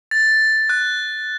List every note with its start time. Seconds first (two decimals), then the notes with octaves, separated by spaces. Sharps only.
0.11 A6
0.69 F#6